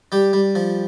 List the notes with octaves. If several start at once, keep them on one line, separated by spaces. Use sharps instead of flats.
G3 G4
G3
F3